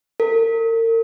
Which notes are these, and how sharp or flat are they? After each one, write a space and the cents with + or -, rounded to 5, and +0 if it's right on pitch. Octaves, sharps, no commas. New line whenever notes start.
A#4 -40